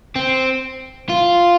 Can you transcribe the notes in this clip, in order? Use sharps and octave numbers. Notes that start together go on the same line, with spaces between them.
C4
F4